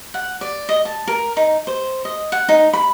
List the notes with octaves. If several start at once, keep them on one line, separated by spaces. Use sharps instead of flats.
F#5
D5
D#5
A5
A#4
D#4
C5
D#5
F#5
D#4
B5